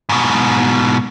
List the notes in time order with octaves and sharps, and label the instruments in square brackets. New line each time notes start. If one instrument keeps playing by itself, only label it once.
[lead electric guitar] G#2 B2